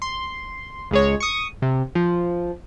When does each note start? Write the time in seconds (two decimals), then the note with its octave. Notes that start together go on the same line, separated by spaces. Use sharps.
0.02 C6
0.91 C#2 G#3 C#5
1.20 C#6 D#6
1.62 C3
1.95 F3